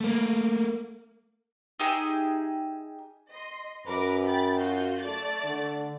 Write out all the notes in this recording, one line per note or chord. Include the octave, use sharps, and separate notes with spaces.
A3 A#3
D#4 G4 G#4 E5
D#5 C6
F#2 A#4 B4 D6
G5 B5 A6
F4 F#4 G6
A3 D5 A6
D3